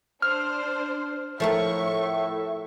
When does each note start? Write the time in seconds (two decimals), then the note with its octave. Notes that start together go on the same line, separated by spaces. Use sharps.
0.22 D4 C5 F6
1.40 A2 F3 A3 A#4 E5 C#6